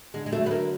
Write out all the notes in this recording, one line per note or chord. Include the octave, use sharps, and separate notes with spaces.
D3 G#3
G#3
F#3 A3
B3
D3 A#3